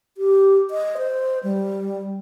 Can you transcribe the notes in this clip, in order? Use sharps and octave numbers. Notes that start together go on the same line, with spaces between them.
G4
D#5
C5
G3